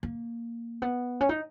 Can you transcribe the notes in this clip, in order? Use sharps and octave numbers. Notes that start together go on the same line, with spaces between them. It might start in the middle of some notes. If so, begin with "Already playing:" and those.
A#3
B3
C#4
D#4